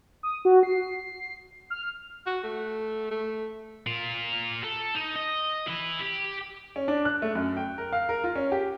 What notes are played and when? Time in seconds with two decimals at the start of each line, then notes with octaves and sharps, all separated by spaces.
0.23 D#6
0.45 F#4
0.63 C7
1.70 F6
2.26 F#4
2.43 A3
3.11 A3
3.87 F4 A#4
4.64 A4
4.95 D#4
5.16 D#5
5.68 E4 B4
6.00 G4
6.76 C#4
6.88 D4
7.05 F#6
7.22 A3
7.35 F#2
7.57 G5
7.78 A#4
7.93 F5
8.09 A#4
8.24 F4
8.36 C#4
8.52 G4